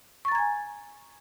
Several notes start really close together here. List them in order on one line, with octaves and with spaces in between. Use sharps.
C#6 A6 A#5 G#6 G#5